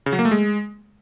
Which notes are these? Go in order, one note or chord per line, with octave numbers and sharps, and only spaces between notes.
C#3
F#3
A#3
A3
G#3